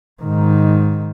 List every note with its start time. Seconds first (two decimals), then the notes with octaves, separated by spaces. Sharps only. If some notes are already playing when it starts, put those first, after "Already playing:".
0.22 G#2 D#3